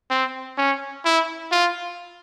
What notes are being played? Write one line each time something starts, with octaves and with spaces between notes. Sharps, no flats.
C4
C#4
E4
F4